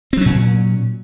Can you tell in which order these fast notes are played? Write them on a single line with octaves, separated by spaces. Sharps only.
C4 F#3 C#4 A#2